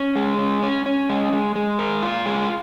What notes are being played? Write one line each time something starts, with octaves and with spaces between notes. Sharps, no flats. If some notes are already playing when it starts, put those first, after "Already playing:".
Already playing: C#4
G#3
C#4
C#4
C#4
G#3
G#3
G#3
A#4
F4
G#3